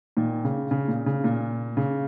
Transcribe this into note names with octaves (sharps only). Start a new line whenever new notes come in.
A#2 D#3
C#3
C#3
A#2
C#3
A#2
C#3